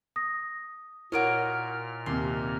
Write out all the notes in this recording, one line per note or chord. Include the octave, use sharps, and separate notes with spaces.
D#6 A#6
A#2 E4 F#4 A#4 C#5 D#5 F6 D7
D#2 C3 C6